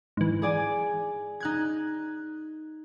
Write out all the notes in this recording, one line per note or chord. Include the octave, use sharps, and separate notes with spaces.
G#2 E3
G#4 D5 G#5
D#4 F#6 G#6